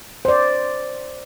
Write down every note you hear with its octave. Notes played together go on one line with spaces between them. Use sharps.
C5 D5